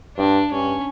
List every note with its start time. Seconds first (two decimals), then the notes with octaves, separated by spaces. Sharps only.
0.17 G2 D4
0.52 G2 C#4